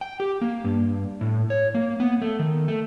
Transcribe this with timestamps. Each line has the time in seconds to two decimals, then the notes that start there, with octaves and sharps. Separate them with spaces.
0.01 G5
0.20 G4
0.41 A#3
0.64 G2
1.21 A2
1.50 C#5
1.75 A#3
2.00 B3
2.22 A3
2.39 D#3
2.68 A3